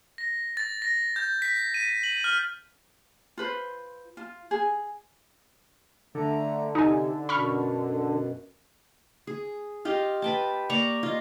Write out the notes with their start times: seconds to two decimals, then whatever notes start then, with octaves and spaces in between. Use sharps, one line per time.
0.18 A#6
0.57 A6
0.82 A#6
1.16 G6
1.42 B6
1.74 D#7
2.03 F#7
2.24 F6
3.37 F4 B4 C5
4.17 F4
4.51 G#4
6.15 D3 A3 A#5
6.75 C3 D#4 G#5
7.29 F#2 B2 B5 C#6 F6
9.27 G#4
9.85 F4 G4 D#5
10.22 B4 G5 A5
10.70 A#3 D5 A#5 C#6
11.03 F4 D#5